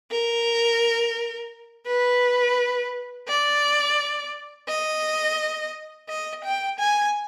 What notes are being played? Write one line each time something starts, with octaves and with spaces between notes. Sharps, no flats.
A#4
B4
D5
D#5
D#5
G5
G#5